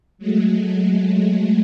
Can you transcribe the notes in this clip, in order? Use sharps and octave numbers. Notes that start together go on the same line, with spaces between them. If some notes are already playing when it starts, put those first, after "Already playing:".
F#3 G#3 A3